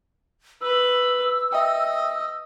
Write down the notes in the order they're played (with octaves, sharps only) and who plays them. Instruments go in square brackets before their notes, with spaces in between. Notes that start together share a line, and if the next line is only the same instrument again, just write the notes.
[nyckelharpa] B4 [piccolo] E6
[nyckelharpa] D#5 [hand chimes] E5 G5